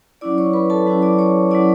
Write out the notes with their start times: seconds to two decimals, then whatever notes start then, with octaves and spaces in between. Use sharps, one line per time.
0.21 F#3 C#4 E4 D5 D6
0.38 C#5 C#6
0.53 B4 B5
0.70 A4 A5
0.87 F#3 C#4 E4
1.02 D5 D6
1.19 C#5 C#6
1.51 F#3 C#4 E4 D5 D6